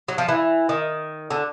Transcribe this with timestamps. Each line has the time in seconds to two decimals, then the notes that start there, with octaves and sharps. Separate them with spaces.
0.08 F#3
0.18 F3
0.28 E3
0.69 D#3
1.31 D3